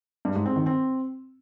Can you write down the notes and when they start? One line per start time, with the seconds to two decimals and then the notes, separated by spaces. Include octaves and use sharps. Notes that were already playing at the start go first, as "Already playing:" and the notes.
0.25 G2
0.35 G#2
0.46 C4
0.56 D#3
0.66 C4